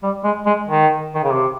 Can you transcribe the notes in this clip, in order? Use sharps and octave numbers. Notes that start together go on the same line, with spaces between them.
G3
G#3
G#3
D#3
D#3
C#3
C3